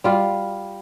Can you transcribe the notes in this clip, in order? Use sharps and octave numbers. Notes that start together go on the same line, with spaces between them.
G3 F4